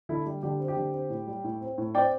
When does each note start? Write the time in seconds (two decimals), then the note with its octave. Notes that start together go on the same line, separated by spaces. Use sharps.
0.09 D3 E4 A4
0.26 G3 G4
0.43 D3 G4
0.60 C4
0.68 G4
0.77 D3
0.94 C4
1.10 A2
1.27 G3
1.44 A2
1.61 C4
1.78 A2
1.95 C4 D5 G5